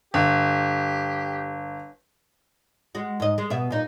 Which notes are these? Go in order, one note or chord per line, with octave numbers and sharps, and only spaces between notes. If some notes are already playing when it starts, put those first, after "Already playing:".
G1 G4
G#3 F#4
G#2 D#5
G#3
B2 B3 E5
A#2 D#4